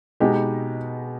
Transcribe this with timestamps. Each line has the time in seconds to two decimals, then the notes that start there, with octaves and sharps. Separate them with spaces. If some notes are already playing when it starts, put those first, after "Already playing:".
0.20 B2 G#3 B3 D#4 G4